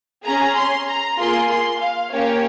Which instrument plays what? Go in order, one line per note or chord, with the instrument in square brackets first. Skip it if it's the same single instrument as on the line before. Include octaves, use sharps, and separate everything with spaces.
[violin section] C#4 G#4 A#5
C6
A#5
A#3 F4 G#4 C6
C6
F5
A#3 C#4 G4 C#5